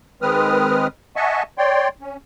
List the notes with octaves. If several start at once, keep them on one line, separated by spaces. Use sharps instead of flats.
D#3 G#3 C4 B4 D#6 F6
D#5 E5 F#5 G#5 A5 C#6
C#5 D5 G5 C6
C#4